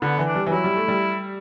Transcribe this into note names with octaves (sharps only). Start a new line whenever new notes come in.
D3 B3
E3
D4
G3
E3
F#3 E4
G3
A3
G3